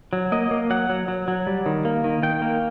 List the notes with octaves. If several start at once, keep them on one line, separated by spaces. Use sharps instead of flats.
F#3
A#3 D#5
A#3
F#3 F#5
F#3
F#3
F#3
G3
D#3
A#3
D#3
D#3 G5
A#3